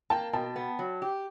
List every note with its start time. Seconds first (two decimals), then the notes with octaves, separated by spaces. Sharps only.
0.10 A#3 G5 A5
0.33 B2 G5 A5
0.56 B3
0.79 F#3
1.02 G4